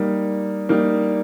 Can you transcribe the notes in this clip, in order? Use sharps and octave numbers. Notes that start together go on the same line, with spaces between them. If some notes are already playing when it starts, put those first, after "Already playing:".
Already playing: G3 A#3 D#4
G3 A#3 D#4